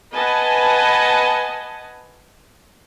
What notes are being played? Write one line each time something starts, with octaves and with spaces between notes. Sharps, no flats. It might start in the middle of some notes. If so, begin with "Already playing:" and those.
B4 D#5 F#5 G#5 A5